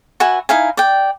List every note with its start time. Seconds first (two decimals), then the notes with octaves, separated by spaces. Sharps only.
0.20 F#4 B4 E5 G#5
0.49 D#4 E4 F5 G#5
0.77 D5 G5